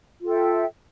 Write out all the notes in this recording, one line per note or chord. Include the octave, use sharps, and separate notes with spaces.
F4 A4 E5 G5